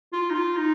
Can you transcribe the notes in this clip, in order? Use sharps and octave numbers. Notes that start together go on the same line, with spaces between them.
F4
D#4
F4
D#4